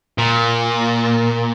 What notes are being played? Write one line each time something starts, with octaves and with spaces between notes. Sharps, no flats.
A#2